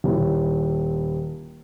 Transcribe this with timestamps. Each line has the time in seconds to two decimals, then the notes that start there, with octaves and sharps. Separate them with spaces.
0.04 D#1 E4